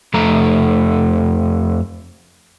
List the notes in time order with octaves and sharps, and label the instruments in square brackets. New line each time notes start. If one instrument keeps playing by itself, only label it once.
[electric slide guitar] F2 A3 A#5